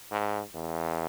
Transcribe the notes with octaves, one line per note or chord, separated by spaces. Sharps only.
G#2
E2